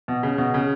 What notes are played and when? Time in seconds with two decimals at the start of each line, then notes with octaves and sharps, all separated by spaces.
0.08 B2
0.23 C#3
0.38 B2
0.54 C#3